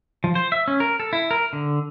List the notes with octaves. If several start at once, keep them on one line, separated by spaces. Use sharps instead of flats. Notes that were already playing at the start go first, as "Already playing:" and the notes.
F3
C5
E5
C#4
A#4
A4
E4
A#4
D3